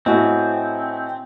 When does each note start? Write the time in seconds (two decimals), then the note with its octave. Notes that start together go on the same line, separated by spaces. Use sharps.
0.06 A2 C4 E4 F#4 D#5 G#5 A5